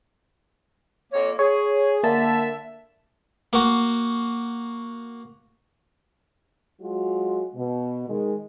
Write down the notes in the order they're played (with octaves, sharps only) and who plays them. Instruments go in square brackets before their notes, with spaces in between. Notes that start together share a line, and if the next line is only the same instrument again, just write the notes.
[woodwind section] F2 A#3 C#5
[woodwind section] G#4 [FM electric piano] C#5
[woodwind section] D3 E5 [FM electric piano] A#3 A5
[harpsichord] A#3 F#4
[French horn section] F#3 G#3 F4 F#4
B2
D#3 G#3